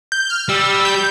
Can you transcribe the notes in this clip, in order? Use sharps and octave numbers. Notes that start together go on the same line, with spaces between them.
G6
F6
G3 E6
G6